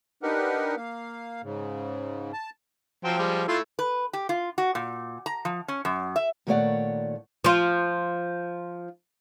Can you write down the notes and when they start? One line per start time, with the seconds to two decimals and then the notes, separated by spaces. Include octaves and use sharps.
0.23 D4 D#4 G4 A#4 B4 F#5
0.77 A#3 F5
1.43 G#2 C#3
2.33 A5
3.05 F3 F#3 C5 G5
3.19 G3 G#3
3.48 A3 E4 F4
3.79 B4
4.13 G4
4.29 F4
4.58 F#4
4.75 A#2
5.26 A#5
5.45 F3
5.68 C#4
5.85 F#2
6.16 E5
6.47 A#2 D#3 A3 C#5 D5 F#5
7.44 F3 F4